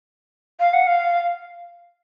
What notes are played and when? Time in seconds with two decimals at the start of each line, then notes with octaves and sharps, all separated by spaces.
0.60 F5
0.73 F#5
0.87 F5